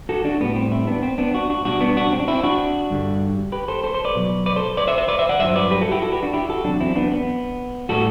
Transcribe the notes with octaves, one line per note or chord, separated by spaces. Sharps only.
F#4 A4
D4 F#4
A2 G3 B3
C4
C4 E4
B3 D4
C4
B3 D4
D4 F#4
D4 F#4
B2 G3 D4 F#4
B3 D4
D4 F#4
C4
D4
C4 E4
D4 F#4
G2 D3 G3
G4 B4
A4 C5
A4 C5
A4 C5
B4 D5
B2 F#3
B4 D5
A4 C5
B4 D5
C5 E5
C5 E5
B4 D5
C5 E5
D5 F#5
G2 F#3 C5 E5
B4 D5
G4 B4
F#4 A4
E4 G4
F#4 A4
G4 B4
D4 F#4
E4 G4
F#4 A4
E2 C3 F#3 D4 F#4
C4 E4
B3 D4
B3
A2 G3 F#4 A4